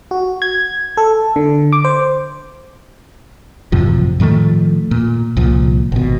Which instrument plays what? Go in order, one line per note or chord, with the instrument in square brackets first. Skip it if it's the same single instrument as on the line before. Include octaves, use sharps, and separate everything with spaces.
[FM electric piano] F#4
G#6
A4
D3
D6
C5
[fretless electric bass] A1 F#2 C3 F3
A2 D#3 F3 A3
A#2
C2 A#2 F3
G#1 B2